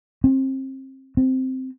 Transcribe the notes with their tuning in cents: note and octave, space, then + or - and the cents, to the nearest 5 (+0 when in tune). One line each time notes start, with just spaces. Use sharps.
C4 +30
C4 -5